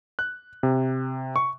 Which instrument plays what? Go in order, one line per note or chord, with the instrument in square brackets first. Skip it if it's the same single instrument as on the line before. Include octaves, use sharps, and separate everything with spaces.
[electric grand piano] F#6
C3
C#6